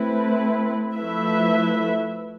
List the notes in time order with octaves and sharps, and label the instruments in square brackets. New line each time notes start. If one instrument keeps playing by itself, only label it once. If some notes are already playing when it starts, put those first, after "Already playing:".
Already playing: [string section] A3 C4 E4 B4
F3 A3 E4 B4 E5